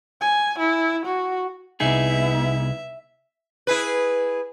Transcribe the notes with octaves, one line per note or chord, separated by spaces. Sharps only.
G#5
E4
F#4
C2 B3 D#4 E4 G#4 E5
E4 G#4 B4